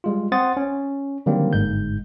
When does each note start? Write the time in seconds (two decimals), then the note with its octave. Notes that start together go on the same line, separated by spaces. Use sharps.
0.04 G3 G#3 F4
0.32 C4 C5 F#5 C6 D#6 A6
0.57 C#4
1.26 D3 D#3 F#3 G3 A#3 C4
1.53 G1 G#2 G#3 G6